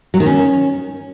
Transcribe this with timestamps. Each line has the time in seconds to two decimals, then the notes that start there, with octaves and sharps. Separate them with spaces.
0.14 F#3
0.20 D#3
0.26 C#4